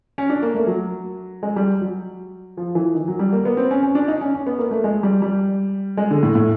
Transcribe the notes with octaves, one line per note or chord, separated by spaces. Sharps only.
C#4
D4
A#3
A3
F#3
G#3
G3
F#3
F3
E3
D#3
F#3
G3
A#3
B3
C4
C#4
C#4
D4
D#4
C#4
C#4
B3
A#3
A3
G#3
G3
G3
G#3
D3
A2
A2